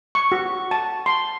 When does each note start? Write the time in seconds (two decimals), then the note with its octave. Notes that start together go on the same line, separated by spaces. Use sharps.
0.15 C#6
0.32 F#4
0.71 A5
1.06 C6